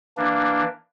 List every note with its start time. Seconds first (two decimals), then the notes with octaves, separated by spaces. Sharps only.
0.17 E3 A#3 D4